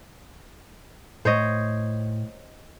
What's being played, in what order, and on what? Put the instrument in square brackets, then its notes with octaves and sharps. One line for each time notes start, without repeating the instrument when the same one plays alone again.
[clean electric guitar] A2 [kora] C5 C#5 D#5